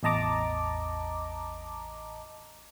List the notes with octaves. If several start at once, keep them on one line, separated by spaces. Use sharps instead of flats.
A1 E2 D#5 A5 A#5 D6